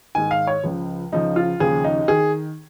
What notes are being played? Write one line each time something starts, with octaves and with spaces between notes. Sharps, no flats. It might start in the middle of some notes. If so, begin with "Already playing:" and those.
G#2 D#3 G#5
F5
C#5
C#2 C#3 F3
C#2 C#3 F3 D#4
F4
D#2 C#3 F3 G#4
D#4
D#3 G#4